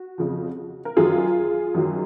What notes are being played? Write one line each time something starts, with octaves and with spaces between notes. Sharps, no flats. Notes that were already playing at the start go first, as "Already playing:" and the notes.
Already playing: F#4
F2 C#3 F3
A#4
F#2 D#3 F#3 F4 G#4
F#2 D#3 F#3